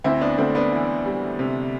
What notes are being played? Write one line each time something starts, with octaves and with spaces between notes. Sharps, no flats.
D2 C4 E4
B3 D4
D2 A3 C4
B3 D4
E3
G3
C3